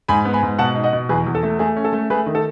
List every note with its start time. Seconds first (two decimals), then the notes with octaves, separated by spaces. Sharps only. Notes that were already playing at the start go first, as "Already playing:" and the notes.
0.08 G#2 G#5 B5
0.25 B3
0.34 G#5 B5
0.43 G#2
0.59 B2 F#5 A5
0.75 D#4
0.84 D#5 F#5
0.93 B2
1.09 E2 G#4 B4
1.27 E2
1.35 A4
1.43 A3
1.59 A3 G#4
1.77 C#4
1.85 A4
1.93 A3
2.10 A3 G#4 B4
2.26 D#3
2.35 A4